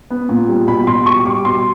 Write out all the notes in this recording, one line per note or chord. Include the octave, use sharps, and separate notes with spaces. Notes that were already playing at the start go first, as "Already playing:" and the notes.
B3
A#2
G3
B2 B5
B2 C6
G3 C#6
G3 D6
B2 C6